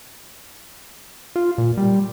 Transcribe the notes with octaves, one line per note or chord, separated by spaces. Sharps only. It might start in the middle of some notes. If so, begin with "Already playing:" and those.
F4
A#2
G3